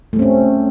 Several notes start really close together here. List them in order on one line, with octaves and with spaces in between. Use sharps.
A3 G3 C4 C#4